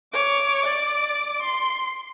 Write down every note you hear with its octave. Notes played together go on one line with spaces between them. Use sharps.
C#5 D6
D5 D6
C6